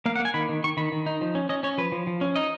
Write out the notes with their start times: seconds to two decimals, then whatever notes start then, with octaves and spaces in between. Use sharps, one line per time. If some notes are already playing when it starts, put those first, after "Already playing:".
0.06 A#3 F5
0.16 F#5
0.20 A#3
0.25 G#5
0.34 D#3 B5
0.49 D#3
0.64 D#3 C#6
0.77 D#3 B5
0.92 D#3
1.06 D#4
1.21 F3
1.35 C#4
1.49 C#4 D#5
1.63 C#4 C#5
1.78 F3 B4
1.92 F3
2.07 F3
2.21 C#4
2.36 D#4 D#5